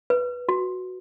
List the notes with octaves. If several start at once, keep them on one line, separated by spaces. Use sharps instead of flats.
B4
F#4